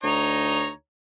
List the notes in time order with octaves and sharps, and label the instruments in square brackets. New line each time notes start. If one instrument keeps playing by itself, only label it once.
[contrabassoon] D2 [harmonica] D#4 C#5 A#5